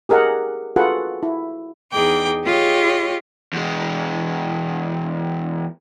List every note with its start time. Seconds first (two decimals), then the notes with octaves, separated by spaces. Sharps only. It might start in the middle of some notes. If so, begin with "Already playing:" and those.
0.09 G4 G#4 A#4 D#5 F#5
0.76 F4 F#4 G#4 A4 B4 F#5
1.23 E4
1.92 E2 D#4 G#4 G5 D6
2.44 F4 G4 G#4 C#5 D#5
3.53 E2 G#3